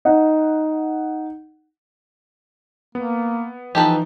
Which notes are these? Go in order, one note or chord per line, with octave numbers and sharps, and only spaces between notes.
D#4 F#5
A#3 B3
E3 F3 D#4 G4 A4 B4